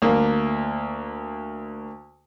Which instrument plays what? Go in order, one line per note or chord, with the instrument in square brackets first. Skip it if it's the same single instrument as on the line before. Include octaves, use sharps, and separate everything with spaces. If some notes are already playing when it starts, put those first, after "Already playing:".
[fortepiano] D2 A#3